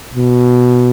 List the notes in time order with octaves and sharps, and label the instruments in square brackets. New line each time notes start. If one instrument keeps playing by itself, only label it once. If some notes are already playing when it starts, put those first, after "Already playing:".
[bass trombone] B2